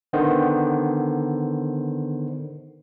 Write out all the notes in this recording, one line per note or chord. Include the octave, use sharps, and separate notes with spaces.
D3 D#3 B3 C5